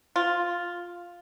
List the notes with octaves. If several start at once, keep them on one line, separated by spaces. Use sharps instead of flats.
F4